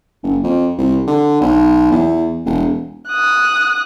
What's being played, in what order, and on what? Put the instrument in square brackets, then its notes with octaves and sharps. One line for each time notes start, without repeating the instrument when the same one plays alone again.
[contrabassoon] F#1
F2
C2
D3
B1
E2
E1
[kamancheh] D#6 F#6